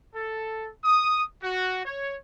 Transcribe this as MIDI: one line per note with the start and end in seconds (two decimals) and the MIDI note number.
0.14 0.68 69
0.84 1.23 87
1.43 1.83 66
1.86 2.16 73